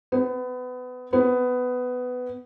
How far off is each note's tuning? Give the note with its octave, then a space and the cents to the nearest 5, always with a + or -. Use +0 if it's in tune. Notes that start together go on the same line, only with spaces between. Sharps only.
B3 +25
B3 +15